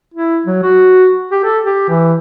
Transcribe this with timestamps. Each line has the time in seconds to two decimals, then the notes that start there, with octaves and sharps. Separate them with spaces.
0.14 E4
0.45 F#3
0.63 F#4
1.31 G4
1.44 A4
1.64 G4
1.89 E3